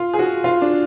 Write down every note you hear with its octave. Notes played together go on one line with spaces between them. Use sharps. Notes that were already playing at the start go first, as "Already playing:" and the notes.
Already playing: F4
G#4
F#4
F4
D4